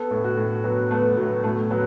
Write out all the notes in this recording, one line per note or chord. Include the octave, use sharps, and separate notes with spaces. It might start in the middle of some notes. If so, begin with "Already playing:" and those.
Already playing: B3 A4
A2
F#4
A2
F#3 B3
A3 B3
A2 F#3
A2 A3
F#3 B3